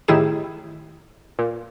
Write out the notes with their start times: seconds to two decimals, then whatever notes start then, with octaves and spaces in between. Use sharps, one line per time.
0.08 A2 D#3 E4 G4 G#4 E7
1.39 A#2